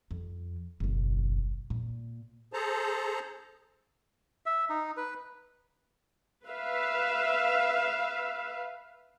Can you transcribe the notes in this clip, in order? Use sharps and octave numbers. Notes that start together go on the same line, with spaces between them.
F2
F#1 B1
A#2
G#4 A4 C5 A5 A#5
E5
D#4
B4
B4 E5 F5